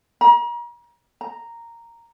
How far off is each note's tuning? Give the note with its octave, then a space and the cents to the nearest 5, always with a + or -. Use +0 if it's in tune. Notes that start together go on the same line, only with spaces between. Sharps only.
A#5 +40
A#5 -5